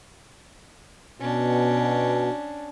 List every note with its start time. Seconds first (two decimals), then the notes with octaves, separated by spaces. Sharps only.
1.20 B2 C#4 D4